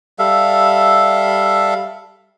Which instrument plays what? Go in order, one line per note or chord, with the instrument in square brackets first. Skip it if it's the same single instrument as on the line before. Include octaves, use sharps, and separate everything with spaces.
[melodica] G3 A4 E5 F5